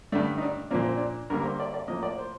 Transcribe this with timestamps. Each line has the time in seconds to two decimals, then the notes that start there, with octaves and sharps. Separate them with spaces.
0.12 G2 D3 A3 D4
0.38 D#4
0.42 D4
0.71 A#2 F3 A#3 D4
0.84 C4
0.98 D4
1.30 G2 D3 G3 A#3 A#4
1.40 A#4
1.45 C5
1.60 D5
1.74 D5
1.88 A2 F3 A#3 D#5
2.03 D5
2.18 C5